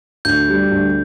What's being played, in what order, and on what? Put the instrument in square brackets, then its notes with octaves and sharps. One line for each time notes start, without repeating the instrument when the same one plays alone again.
[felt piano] D2 [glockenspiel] G6
[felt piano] G3
D2